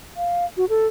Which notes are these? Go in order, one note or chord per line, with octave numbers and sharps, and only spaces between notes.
F5
F#4
A4